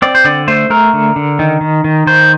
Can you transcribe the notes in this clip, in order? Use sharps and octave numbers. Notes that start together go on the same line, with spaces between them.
C4 D5
C5
D3 D5
A3 C5
A3 A#4
D3
D3
D#3
D#3
D#3
D#3 C5